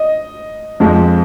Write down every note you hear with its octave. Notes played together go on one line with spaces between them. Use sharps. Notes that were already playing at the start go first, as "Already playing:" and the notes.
Already playing: D#5
F2 F3 G#3